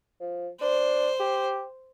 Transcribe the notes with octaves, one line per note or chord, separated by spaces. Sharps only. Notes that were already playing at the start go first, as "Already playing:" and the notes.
F3
D4 C5
G4